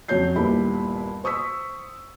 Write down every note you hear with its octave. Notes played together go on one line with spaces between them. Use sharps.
F2 F#3 C#4 C#5 G6 C7
G1 D#2 A#2 E4 G4 B5
C5 C#6 D#6 E6 B6